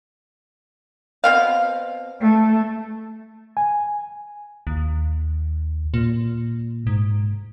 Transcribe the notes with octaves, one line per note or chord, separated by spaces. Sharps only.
B2 C4 F5
A3
G#5
D#2
A#2
G#2